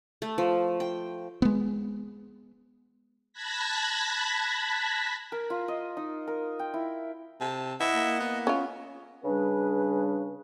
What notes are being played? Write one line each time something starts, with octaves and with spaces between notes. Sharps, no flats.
A3
F3
G5
G#3 B3
A5 B5 F#6 G#6 A#6 B6
A#4
F4
D#5
D#4
A#4
G5
E4
C3 A5
E4 D#5 F#5
A#3
B3
C#4 F4
C#3 G3 D4 G#4 B4